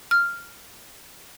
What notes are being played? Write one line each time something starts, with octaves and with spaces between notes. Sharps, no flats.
F6